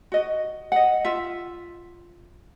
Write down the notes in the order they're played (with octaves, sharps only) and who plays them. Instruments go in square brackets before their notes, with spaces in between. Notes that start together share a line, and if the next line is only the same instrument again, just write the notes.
[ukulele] F#4 D#5
D#5 F#5
F4 E5